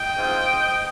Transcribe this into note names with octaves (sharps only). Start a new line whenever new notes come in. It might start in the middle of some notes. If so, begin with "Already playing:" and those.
Already playing: D#5 G5
G#2 F3 C4